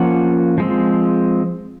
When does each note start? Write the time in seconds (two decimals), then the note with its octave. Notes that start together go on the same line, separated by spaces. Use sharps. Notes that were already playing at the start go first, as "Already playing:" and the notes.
Already playing: F3 A#3 C#4 F#5
0.58 F3 G#3 C4